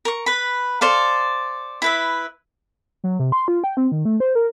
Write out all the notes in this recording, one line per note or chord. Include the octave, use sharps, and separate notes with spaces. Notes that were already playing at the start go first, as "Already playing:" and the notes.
A#4 C#6
B4 B5
A4 C5 D5 F5
E4 B4 E5
F#3
C3
C6
F4
G5
C4
D#3
A3
C5
A#4